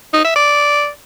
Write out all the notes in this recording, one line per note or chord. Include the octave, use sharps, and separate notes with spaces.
D#4
E5
D5